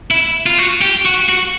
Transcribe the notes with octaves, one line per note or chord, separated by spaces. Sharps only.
E4
F4
F#4
G4
F#4
F#4